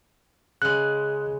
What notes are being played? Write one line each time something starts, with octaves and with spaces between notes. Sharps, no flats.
C#3 G#3 F#6